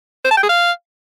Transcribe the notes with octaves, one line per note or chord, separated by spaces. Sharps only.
C5
A5
G5
G#4
F5